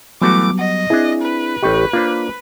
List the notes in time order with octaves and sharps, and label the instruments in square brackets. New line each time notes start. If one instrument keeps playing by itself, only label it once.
[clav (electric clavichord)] E3 A3 F#4 [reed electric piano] F#3 G3 B3 [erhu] D6
[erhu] D#5 [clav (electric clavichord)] F#5
[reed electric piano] C4 E4 [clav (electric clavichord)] D4 G#4
[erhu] B4
[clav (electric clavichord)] A1 D#5 [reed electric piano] G4 C#6 G6
[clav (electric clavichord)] A#3 D4 C5 [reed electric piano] F4